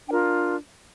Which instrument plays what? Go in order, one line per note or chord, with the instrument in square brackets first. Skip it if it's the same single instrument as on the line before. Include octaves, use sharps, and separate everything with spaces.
[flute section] D4 F4 A#4 G5